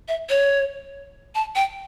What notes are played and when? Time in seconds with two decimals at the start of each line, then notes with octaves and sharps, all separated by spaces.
0.08 E5
0.30 C#5
1.35 A5
1.56 G5